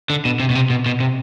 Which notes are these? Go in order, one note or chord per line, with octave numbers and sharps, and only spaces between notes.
D3
B2
C3
B2
C3
B2
B2
C3